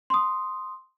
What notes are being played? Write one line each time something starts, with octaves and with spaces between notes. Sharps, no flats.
C6 D#6